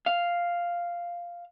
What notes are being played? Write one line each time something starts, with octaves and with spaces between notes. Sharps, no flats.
F5